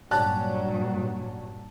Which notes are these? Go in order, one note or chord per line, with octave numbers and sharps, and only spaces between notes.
G2 A#2 F#3 G3 C#4 D4 A5 F#6